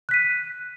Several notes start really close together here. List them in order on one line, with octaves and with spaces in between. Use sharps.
F#6 B6 D#7